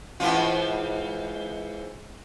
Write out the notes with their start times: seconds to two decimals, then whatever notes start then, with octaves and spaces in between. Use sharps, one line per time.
0.20 G#2 E3 F4